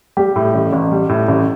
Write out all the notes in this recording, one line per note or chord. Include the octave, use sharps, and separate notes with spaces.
G3 G4
A2
A1
A1
G3
A2
A1